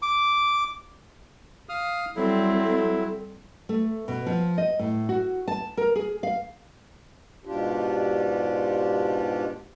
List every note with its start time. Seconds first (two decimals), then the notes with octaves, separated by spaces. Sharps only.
0.02 D6
1.69 F5 D#6 F6
2.16 F#3 G3 C4 E4 A4
2.64 A4
3.69 A3
4.08 B2
4.27 F3
4.58 D#5
4.79 A2
5.09 F#4
5.48 A5
5.77 A#4
5.95 G#4
6.23 F5
7.45 G#2 B2 D4 F4 G4